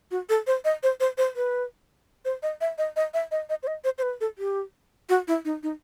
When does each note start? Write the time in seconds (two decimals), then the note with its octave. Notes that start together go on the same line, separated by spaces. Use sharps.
0.11 F#4
0.29 A4
0.47 C5
0.65 D#5
0.83 C5
1.00 C5
1.18 C5
1.36 B4
2.25 C5
2.43 D#5
2.61 E5
2.78 D#5
2.96 D#5
3.14 E5
3.31 D#5
3.49 D#5
3.63 C5
3.67 D#5
3.84 C5
3.98 C5
4.02 B4
4.21 A4
4.38 G4
5.09 F#4
5.28 E4
5.45 D#4
5.63 D#4